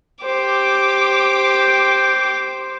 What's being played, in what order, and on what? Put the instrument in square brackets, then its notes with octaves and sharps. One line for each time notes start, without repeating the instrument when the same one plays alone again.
[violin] G4 D6 [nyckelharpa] C5